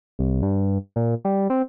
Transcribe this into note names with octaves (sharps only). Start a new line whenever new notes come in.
C2
G2
A#2
G3
C4